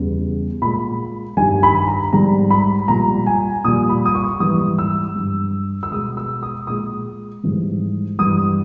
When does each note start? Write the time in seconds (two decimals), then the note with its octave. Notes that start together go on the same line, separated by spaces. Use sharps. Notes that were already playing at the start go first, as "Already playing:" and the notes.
Already playing: E2 C#3 G3
0.61 A#2 G#3 B5
1.37 G2 D#3 G3 G#5
1.63 B5
1.88 A#5
2.13 G#2 G3 A#5
2.50 B5
2.88 A#2 G3 A#5
3.26 G#5
3.64 A#2 G3 D#6
3.89 B5
4.05 D#6
4.15 C#6
4.40 G#2 E3 G3 D#6
4.79 E6
5.16 G2 G3
5.83 E6
5.91 B2 G#3 D#6
6.17 E6
6.43 D#6
6.67 A#2 G#3 D#6
7.43 G#2 E3 G3
8.19 G2 E3 G3 D#6